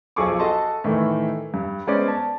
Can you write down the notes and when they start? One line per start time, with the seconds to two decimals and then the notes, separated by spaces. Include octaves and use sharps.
0.16 B1 F3 G#4 A4 C#6 D6
0.39 F#4 A4 D#5 A5 C6
0.84 A2 D#3 E3 A3
1.54 G2
1.87 G#3 B3 C#4 C5 D5
2.08 A5